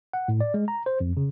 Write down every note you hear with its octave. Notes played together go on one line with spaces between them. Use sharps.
F#5
A2
D5
G#3
A#5
C5
F2
C#3